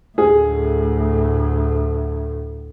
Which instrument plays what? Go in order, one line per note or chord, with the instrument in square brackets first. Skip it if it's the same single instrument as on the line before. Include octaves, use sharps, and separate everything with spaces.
[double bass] D2 A2 [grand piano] G#4